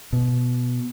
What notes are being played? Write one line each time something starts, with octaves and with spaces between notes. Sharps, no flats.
B2